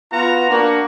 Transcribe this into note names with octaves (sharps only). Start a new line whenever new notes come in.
B3 F4 F#4 A#5
A#3 D4 F#4